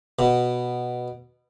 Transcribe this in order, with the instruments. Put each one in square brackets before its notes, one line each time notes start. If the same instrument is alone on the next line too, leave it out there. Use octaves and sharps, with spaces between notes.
[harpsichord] B2